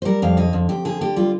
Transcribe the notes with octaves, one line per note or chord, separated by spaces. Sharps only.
C5
G3 A#4
F2 F5
D3 D#5
F2
F2 G4
D3 G#4
D3 G4
G3 F4